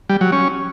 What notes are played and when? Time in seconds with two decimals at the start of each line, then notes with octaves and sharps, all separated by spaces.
0.09 G3
0.21 F#3
0.32 C#4